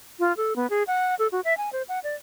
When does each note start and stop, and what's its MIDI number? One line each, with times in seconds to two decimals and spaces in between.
0.20 0.35 65
0.37 0.56 69
0.56 0.69 59
0.70 0.83 68
0.87 1.15 78
1.19 1.28 69
1.32 1.41 66
1.45 1.56 76
1.57 1.70 80
1.73 1.82 72
1.89 1.99 78
2.04 2.15 74